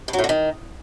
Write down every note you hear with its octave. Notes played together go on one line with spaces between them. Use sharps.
G2
F#3
A2
D3
D#3